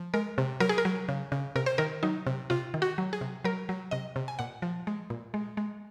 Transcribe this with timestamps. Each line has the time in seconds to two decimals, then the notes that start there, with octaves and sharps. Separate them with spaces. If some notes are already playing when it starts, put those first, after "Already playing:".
Already playing: F3
0.14 G#3 A#4
0.38 C3
0.60 F#3 A#4
0.69 G#4
0.78 A#4
0.85 F#3
1.09 C#3
1.32 C#3
1.56 C3 A#4
1.66 C5
1.78 D#3 A#4
2.03 F#3 D#4
2.27 C3
2.50 C3 F4
2.74 D#3
2.82 F#4
2.98 F#3
3.13 G#4
3.21 C3
3.44 F#3 A#4
3.69 F#3
3.91 C3 D#5
4.16 C3
4.28 G#5
4.39 A#2 F#5
4.62 F3
4.87 G#3
5.10 A#2
5.34 G#3
5.57 G#3